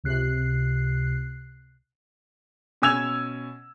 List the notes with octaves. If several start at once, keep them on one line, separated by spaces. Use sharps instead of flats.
C#2 C3 F#6 C7
B2 C#4 G#5 E6 G#6 F7